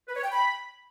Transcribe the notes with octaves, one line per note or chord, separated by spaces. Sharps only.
B4
C#5
G5
B5